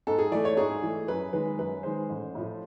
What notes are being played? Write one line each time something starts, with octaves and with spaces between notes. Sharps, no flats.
G#2 A4
G#4
E3 A3 D5
C#5
G#2 G#4
E3 A3
F#2 B4
D#3 G#3 B4
F#2 B4
D#3 G#3 C5
A1
A2 F3